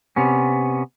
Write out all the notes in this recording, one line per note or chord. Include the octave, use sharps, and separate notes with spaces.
C3 B3 C#4